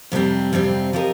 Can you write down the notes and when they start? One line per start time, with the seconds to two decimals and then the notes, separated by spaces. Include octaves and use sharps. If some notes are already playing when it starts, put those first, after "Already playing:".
0.12 F2 C3 G3 C4
0.53 F2 C3 G3 C4
0.93 F3 C4 G4 A#4 D#5